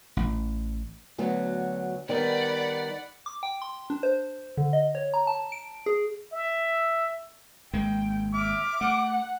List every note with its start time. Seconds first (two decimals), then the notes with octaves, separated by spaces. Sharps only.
0.17 A1
1.18 D2 F#3 B3
2.09 D#3 G3 B3 D5 F#5 B5
3.26 D6
3.43 G5
3.62 C6
3.90 D4
4.03 C5
4.57 D3
4.73 D#5
4.95 C#5
5.14 A#5
5.27 A5
5.52 D7
5.86 G#4
6.33 E5
7.73 G#1 G#3 A#3 G5
8.34 E5 D6 F6
8.81 A3 F#5